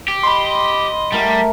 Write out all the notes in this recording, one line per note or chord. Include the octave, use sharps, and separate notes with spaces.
G4
D#5 B5 C6
G3 A3 A#4 F#5